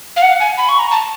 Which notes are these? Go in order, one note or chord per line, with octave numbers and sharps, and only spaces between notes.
F5
F#5
G#5
B5
C#6
A#5
A5